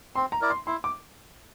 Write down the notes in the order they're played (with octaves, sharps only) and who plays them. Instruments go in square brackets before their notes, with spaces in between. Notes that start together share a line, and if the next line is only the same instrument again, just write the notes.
[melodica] C4 [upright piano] C6
[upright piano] A#5
[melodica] E4 A#4 D5
[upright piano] C6
[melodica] E4 [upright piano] C6
[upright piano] D6